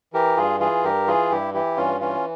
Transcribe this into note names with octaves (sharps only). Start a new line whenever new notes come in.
E3 G4 A#4
G2 F4 G#4
E3 F4 G#4
G2 G4 A#4
E3 F4 G#4
G2 E4 G4
E3 E4 G4
G2 C#4 F4
E3 C#4 F4